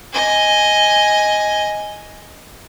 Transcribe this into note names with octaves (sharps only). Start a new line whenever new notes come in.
D#5 G#5